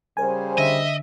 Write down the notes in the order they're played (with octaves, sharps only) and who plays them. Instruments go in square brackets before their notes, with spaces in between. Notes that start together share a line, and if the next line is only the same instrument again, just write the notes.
[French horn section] C#3 G3 C5 [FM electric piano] A#4 G#5
[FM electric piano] D3 [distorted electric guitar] D#5 [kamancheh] E5